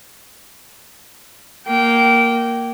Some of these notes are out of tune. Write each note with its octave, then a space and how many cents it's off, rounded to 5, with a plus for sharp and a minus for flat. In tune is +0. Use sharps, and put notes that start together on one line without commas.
A#3 +0 G5 -25